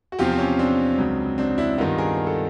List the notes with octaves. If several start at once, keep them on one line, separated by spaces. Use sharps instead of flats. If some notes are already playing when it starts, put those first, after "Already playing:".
F#4
E2 C3 F3 F4 G4
C4
C#4
C4 D4
C#2 C#3 F#3
C4 D4
D4 E4
G2 D#3 G3 B3 D#4 F4
G#4 A#4
A#4
A4